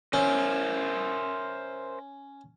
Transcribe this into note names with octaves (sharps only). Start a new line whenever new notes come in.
C#4 A#4 C5 E5